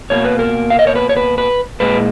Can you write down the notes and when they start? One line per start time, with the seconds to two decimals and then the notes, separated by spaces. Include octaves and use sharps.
0.10 B2 A#3 C#5
0.25 B4
0.39 A#4
0.70 F5
0.79 D#5
0.87 C#5
0.95 B4
1.09 C#5
1.17 B4
1.38 B4
1.80 A#2 G#3 B4